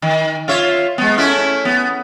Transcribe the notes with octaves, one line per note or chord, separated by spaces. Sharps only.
D#3
F4 C#5 E5
G#3 B3
A3 C#4 E4
B3